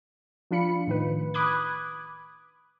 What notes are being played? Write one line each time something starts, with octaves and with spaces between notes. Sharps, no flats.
F3 D4 F4 B5 C#7
A2 D#3 B4
B5 D6 D#6 F#6 G#6